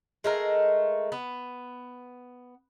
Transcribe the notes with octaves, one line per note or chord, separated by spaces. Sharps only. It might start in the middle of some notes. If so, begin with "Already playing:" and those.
G#3 A3 A#4
B3